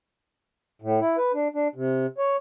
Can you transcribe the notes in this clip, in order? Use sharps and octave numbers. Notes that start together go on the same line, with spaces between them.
A2
E4
B4
D4
D4
C3
C#5